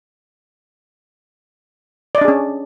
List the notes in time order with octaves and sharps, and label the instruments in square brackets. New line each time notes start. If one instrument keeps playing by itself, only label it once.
[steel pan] D5
D#5
D4
G#4
C#4